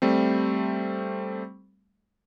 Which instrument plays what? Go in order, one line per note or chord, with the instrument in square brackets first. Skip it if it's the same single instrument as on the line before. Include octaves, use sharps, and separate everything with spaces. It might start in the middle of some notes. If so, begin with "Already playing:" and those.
[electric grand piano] G3 A3 C4